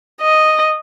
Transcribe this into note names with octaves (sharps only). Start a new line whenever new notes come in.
D#5